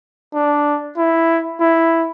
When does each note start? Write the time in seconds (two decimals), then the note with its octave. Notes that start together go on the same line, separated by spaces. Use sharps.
0.34 D4
0.97 E4
1.60 E4